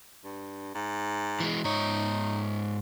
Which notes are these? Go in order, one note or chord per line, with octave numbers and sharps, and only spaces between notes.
G2
G#2
E3 G#3
G#2 D#4 C#5